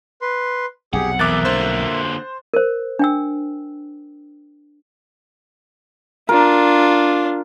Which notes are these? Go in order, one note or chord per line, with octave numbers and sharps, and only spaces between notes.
B4 C6
B1 F2 C3 G4 G#4 F#5
E2 A#4 E5 D6 F#6 A6
D3 A#3 C5 C6
A#4 C5
D4 G5 E6
D4 F4 A#4